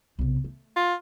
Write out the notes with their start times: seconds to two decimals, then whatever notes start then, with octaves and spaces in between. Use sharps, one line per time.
0.19 B1 C3
0.44 A3
0.76 F4